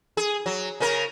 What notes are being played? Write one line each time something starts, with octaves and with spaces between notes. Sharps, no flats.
G#4
F#3
C#3 C#4 A#4